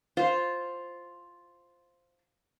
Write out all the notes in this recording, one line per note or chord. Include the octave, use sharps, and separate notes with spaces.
F4 C5